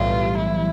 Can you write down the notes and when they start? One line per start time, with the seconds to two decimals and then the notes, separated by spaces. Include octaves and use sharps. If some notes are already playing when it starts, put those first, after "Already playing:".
Already playing: B1 A2 E3 G3 F4
0.38 E4